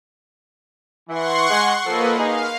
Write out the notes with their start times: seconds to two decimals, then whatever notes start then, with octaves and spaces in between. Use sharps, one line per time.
1.09 E3 F#5 C6 C#6
1.50 G#3
1.86 F3 A#3 A4 B4 D#5
2.17 D#4 G#4 F5